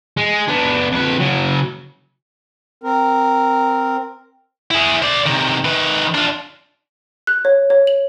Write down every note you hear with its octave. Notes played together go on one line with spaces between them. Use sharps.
G#3
B3 D4
F2 B4
C#3 F#3
C4 A#4
E4 G#4
C5 D5
C3 D#3
D#3 B4
D4 F4
F#6
C#5
C#5
F#7